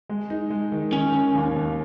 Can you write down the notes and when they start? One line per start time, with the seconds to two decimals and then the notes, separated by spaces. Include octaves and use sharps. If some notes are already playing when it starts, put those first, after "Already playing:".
0.09 G#3
0.30 D#4
0.50 G#3
0.72 D#3
0.93 D#3 C#4
1.14 D#3
1.35 D#2
1.56 D#2